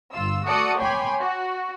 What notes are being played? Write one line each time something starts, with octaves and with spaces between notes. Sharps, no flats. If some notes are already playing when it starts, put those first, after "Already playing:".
G1 F4 E6
A3 F#4 A4 D5 D#6 C#7
C#5 G5 G#5 B5 C6 D6
F#4